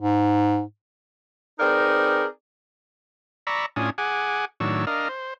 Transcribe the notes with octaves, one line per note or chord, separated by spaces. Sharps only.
G#2
C4 D#4 G#4 A#4 B4 D5
D5 A#5 B5 C#6 E6
A2 C#4 D4 F4 G#5 D#6
G#4 F#5 G#5 D6
A2 D#3 F#3 D4 C#5 E6
D4 A#4 D#5 F5
C5